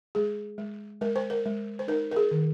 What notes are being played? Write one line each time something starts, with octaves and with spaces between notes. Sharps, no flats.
G#3 G#4
G#3
G#3 A#4
C5
A#4
G#3
C5
D#4 A#4
A#4
G#4
D#3